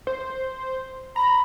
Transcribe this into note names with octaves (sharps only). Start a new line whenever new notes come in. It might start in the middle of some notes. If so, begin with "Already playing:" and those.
C5
A#5 B5